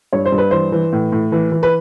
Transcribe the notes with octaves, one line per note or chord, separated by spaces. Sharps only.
G2 C#5
C5
G2
B4
E3 C5
E3
A2
A2
E3
E3
B4